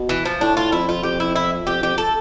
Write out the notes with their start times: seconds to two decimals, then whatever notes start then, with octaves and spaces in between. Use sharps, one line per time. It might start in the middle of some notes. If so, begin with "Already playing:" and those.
Already playing: B2
0.09 E3
0.25 F3
0.41 A2 D4
0.57 A2 F4
0.72 F2 E4
0.88 F2 F4
1.03 F2 G4
1.20 E4
1.36 E4
1.67 F2 G4
1.82 F2 G4
1.98 A4